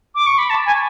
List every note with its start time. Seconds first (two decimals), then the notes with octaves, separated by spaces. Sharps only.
0.15 D6
0.26 C#6
0.38 B5
0.50 A5
0.66 G#5